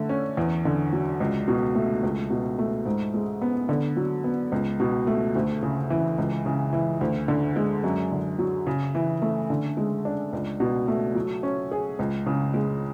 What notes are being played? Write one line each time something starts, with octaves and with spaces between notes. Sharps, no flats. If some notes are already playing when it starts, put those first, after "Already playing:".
Already playing: D3 A3
C#4
E2
D3
F#3
C#2
B2
A3
C#2
B2
A3
G#2
G#3
B3
D3
F#3
B3
C#2
B2
A3
D2
C#3
E3
C#2
C#3
E3
D2
D3
G#3
F#2
D3
F#3
C#3
E3
A3
D3
G#3
D4
C#2
B2
A3
F#3
C#4
G#4
C#2
C#3
G#3